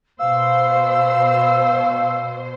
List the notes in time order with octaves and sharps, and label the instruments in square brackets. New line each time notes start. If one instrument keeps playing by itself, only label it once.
[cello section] B2 C5 [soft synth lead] F5 [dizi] E6